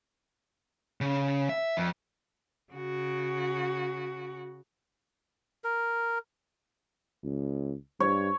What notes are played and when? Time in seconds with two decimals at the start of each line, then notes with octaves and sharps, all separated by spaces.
1.01 C#3
1.49 E5
1.77 F2
2.73 C#3 F#4
5.64 A#4
7.24 C#2
8.00 G2 C#5